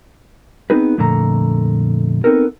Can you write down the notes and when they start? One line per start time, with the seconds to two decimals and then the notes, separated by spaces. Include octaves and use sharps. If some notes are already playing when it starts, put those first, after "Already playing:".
0.70 B3 C4 D#4 G#4 B4
0.98 F2 A#2 D3 A3 A#5
2.24 B3 C4 D#4 A4 A#4